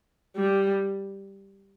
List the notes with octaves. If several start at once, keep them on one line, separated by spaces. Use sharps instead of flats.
G3